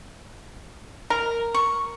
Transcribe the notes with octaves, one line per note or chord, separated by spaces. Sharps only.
A#4
C#6